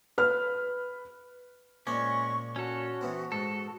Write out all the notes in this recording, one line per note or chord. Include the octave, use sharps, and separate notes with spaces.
B4 F6
A#2 G#3 C4 C#4 D5 C#6
C#4 F#4 A4
E3 B3 C4
G#2 A4